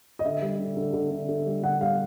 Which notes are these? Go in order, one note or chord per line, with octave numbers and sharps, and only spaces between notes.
D#5
D3 E5
G3
D3
D3
D3
D3
D3
G3
D3 F#5
G3 F5